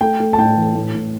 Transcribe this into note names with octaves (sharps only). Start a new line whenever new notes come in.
A3 G5
A3
A5
A2 G5
E3
A2
A2